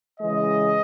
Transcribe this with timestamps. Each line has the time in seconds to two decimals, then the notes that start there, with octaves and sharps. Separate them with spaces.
0.20 C#3 E3 G#3 D#5